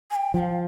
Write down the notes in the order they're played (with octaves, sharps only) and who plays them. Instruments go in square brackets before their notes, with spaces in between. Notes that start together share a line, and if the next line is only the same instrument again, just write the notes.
[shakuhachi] G#5
G5
[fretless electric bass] F3 [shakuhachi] G5
[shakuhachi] F5